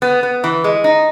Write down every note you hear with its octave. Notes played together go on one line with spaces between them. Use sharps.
B3
B3
E3
G#3
D#4